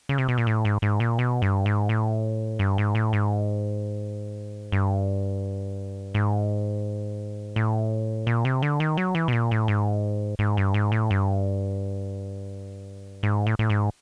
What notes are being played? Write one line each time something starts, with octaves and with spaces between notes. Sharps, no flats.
C#3
C3
B2
A#2
A2
G#2
G#2
A#2
B2
G2
G#2
A2
G2
G#2
A2
G#2
G2
G#2
A2
A#2
C3
D3
D#3
F#3
E3
B2
A#2
A2
G#2
G#2
G2
G#2
A2
G2
G#2
A2
A2
G#2